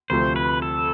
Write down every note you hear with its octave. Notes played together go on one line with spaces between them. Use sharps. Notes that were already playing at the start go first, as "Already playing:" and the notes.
D2 C3 F3 A3 C5
B4
A4